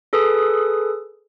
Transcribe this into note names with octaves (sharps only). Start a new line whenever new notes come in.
G#4 A4 B4 D#6